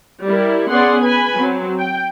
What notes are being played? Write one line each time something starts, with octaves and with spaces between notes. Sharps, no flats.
G3 E4 A#4
B3 C#4 G#4 D5 F#5 C6
B4 G#5 B5
F#3 C4
G5